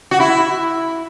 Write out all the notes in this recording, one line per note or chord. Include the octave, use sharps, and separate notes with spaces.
F#4
E4